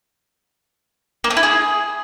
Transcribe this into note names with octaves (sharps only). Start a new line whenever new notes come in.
A#3
A3
E4
G#4